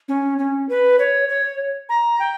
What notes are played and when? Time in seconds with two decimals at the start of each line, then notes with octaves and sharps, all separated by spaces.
0.08 C#4
0.39 C#4
0.69 B4
0.99 C#5
1.29 C#5
1.89 A#5
2.20 G5